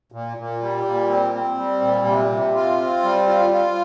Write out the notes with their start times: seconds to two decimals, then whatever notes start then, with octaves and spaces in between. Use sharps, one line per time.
0.12 A#2
0.37 A#2
0.61 G3
0.85 A#2
1.09 C4
1.33 C4
1.57 G3
1.81 A#2
2.06 C3
2.30 C3
2.55 F4
2.79 C4
3.03 G3
3.28 F4
3.51 F4